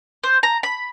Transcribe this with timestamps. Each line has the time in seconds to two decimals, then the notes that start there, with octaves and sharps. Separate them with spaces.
0.24 C5
0.43 A#5
0.63 B5